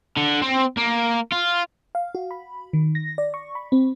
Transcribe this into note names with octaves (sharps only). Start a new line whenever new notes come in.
D3
C4
A#3
F4
F5
F#4
B5
D#3
A#6
D5
C#6
B5
C4